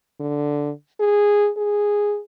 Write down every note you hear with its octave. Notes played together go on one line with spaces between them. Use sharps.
D3
G#4
G#4